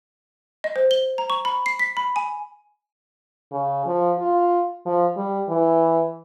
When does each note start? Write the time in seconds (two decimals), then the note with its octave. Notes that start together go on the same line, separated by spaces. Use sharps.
0.64 D#5
0.76 C5
0.91 G7
1.18 A#5
1.30 C#6
1.45 B5
1.66 C7
1.79 B6
1.97 B5
2.16 G#5
3.52 C#3
3.86 F3
4.18 F4
4.85 F3
5.16 G3
5.49 E3